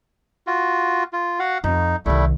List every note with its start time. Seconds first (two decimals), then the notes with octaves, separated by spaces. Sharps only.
0.47 F4 F#4
1.13 F4
1.39 F#4 F5 F#5
1.64 F2 D#4
2.06 C2 D#3 G3 A3 E4